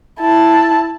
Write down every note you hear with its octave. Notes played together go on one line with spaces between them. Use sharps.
E4 A5